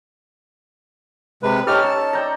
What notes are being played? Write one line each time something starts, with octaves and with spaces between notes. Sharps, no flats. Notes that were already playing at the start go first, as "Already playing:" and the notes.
C3 G#3 B4
C#4 D#4 G4 A4 F6
A5
D5 G5 A#5